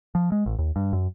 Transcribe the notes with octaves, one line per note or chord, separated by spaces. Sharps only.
F3
G#3
A1
D#2
G2
F#2